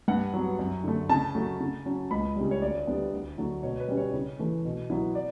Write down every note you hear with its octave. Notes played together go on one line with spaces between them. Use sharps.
G2 F#5
F#3 B3
F#2
D3 A3
C#3 A5
F#3 A3
C#3
F#3 C#4
C#2 B5
C#3 G3
C#5
D2 D5
D3 G3 B3
D2
D3 F#3 A3
B2 C#5
B4
G3 C#4
C#5
C#3
E3 A3
B2
F#3 B3 E4
D5